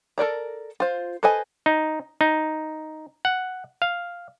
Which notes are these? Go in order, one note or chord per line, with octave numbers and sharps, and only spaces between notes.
A4 A#4 D5 A#5
F4 C5
A4 B4 C5 D#5 G#5
D#4
D#4
F#5
F5